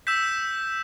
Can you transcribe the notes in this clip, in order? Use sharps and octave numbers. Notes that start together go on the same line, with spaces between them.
E6 G6 B6 E7